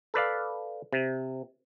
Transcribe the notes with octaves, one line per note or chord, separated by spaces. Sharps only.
A4 B4 D5 F5
C3